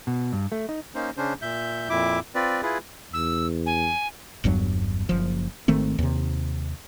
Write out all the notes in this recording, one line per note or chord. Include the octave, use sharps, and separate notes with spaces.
B2
G2
A3
D#4
A#3 C#4 D#4 C5
C#3 C#4 D4 C5
A#2 E5 G6
F2 A#2 E4 E5 D6
C4 F4 B4 D5
E4 F4 G#4 B4
E2 E6
G#5
G1 E2 G2 F#3
F#1 F3
G#1 D#3 A3 C4
D#2 C3